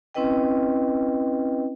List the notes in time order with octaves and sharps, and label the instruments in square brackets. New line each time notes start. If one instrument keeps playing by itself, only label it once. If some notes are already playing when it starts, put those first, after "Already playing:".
[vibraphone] C4 C#4 E4 B4 D#5 G5